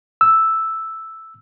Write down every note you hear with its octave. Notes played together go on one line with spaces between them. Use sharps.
E6